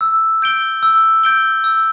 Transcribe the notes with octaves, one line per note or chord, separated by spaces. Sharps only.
E6
G6 D7 G7
E6
G6 D7 G7
E6